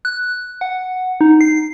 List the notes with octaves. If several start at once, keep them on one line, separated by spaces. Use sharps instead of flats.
F#6
F#5
D#4
C7